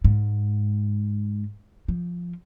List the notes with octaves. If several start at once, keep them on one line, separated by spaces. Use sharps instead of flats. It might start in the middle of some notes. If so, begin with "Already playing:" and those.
G#2
F3